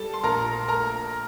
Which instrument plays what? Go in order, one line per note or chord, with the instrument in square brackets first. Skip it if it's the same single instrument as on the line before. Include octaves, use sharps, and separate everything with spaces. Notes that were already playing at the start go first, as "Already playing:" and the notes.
Already playing: [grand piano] G3 A4 A5
C6
A#1 A#4 A#5
A3 A#4 A#5